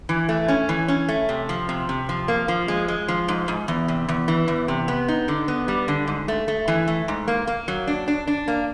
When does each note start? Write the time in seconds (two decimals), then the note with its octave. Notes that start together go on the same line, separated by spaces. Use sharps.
0.09 E3
0.29 A3
0.48 C#4
0.69 E3
0.88 C#4
1.09 A3
1.29 C3
1.49 F3
1.69 C3
1.89 C3
2.09 F3
2.28 A#3
2.48 F3
2.68 G#3
2.88 G#3
3.08 F3
3.28 G#2
3.48 G#2
3.68 E2
3.88 C3
4.09 E2
4.28 E3
4.48 E2
4.68 C3
4.88 B3
5.08 D#4
5.28 D3
5.48 B3
5.68 G3
5.88 D3
6.07 G#2
6.28 A3
6.48 A3
6.68 E3
6.88 A3
7.08 G#2
7.28 A#3
7.47 A#3
7.68 F#3
7.87 D4
8.08 D4
8.27 D4
8.48 A#3